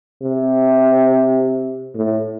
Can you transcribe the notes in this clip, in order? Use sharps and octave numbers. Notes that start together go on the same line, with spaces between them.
C3
A2